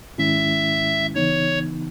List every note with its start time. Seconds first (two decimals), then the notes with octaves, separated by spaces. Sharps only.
0.18 G#2 D#3 G#3 C#4 E4 E5
1.15 C#3 E3 B3 D#4 C#5